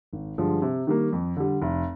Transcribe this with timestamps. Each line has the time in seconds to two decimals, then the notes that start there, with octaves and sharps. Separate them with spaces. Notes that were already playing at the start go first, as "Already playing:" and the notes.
0.13 G#1
0.38 G2 D3 F3 G#3
0.62 C3
0.87 D#3 G3 A#3
1.12 F2
1.37 D3 G3
1.62 F1